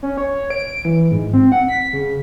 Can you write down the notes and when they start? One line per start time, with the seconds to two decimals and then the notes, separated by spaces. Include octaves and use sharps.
0.03 C#4
0.17 C#5
0.50 D7
0.85 E3
1.12 G#2
1.33 C4
1.52 F#5
1.68 B6
1.93 C#3